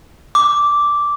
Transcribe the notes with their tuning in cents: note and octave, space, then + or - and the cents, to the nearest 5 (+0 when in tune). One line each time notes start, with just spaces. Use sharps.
D6 -10